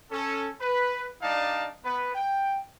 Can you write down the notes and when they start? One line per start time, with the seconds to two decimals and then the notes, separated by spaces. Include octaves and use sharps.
0.11 C#4 A4
0.60 B4
1.22 G3 D4 D#4 D5 F5 A5
1.84 B3 B4
2.14 G5